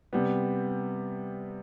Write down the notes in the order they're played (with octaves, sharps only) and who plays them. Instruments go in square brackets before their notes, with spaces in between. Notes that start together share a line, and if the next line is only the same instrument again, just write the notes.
[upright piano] C3 G3 B3